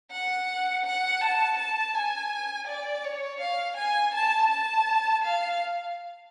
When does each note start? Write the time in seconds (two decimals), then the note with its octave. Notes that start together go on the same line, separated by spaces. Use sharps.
0.12 F#5
0.85 F#5
1.21 A5
1.59 A5
1.94 G#5
2.68 D5
3.04 C#5
3.40 F5
3.77 G#5
4.15 A5
4.51 A5
5.24 F5